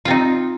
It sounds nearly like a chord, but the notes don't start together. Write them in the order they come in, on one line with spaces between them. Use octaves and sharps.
F4 C4 D#4